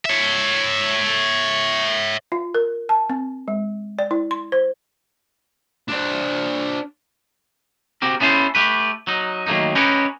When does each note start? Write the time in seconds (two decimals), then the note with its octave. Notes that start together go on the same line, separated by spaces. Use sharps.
0.05 C#5 E5
2.32 F4
2.55 A#4
2.89 A5
3.10 C4
3.48 G#3
3.99 D5
4.11 E4
4.31 C6
4.52 C5
5.88 D4 C5
8.02 C4 F#4 G4 A#4
8.20 B3 C#4 E4 A4 C5
8.55 A3 G4 B4
9.07 F#3 D#4
9.47 D#3 F#3 A3 A#3 D#4
9.75 C#4 D#4 G4 A#4 B4 C#5